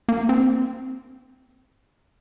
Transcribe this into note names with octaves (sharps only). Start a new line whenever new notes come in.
A#3
C4